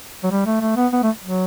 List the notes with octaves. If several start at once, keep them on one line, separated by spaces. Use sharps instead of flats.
F#3
G3
A3
A3
B3
B3
A3
F#3